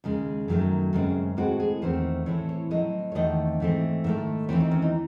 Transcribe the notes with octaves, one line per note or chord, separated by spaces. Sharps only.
D#2 C#3 G#3
F#2 D#3 F#3 A3
F#2 C#3 G#3 C4
A2 G#3 C4 F#4
G#4
E2 D#3 A3 C4 C5
A2 E3 C4 C#5
C#5
A2 F#3 C4 D#5
C#5
E2 D#3 A3 C4 D#5
G#2 E3 A3 C4
G#2 D#3 A3 E5
D#2 C#3 E3 C4 C#5
D#4
C#4
D#4